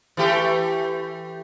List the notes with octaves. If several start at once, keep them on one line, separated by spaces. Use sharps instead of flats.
E3 A3 G4